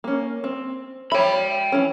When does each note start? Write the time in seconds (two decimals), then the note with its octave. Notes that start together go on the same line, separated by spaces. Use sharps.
0.04 A#3 C#4
0.44 C4
1.12 C#5 E5 G5 B5
1.72 E3 C#4